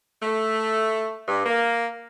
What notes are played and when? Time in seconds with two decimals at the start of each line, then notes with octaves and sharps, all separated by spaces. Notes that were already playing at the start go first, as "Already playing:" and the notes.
0.23 A3
1.28 G2
1.46 A#3